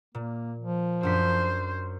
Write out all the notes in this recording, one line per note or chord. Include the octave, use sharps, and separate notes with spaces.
A#2 A#3
F3
F#2 D4 C5 B6